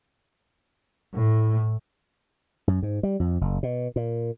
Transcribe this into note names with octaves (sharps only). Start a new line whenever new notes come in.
A2
F#2
G#2
G3
F2
F#1
B2
A#2